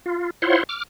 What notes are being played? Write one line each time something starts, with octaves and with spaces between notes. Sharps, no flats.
F4
E4 F4 C5 C#5 F#5 C6
D6 F6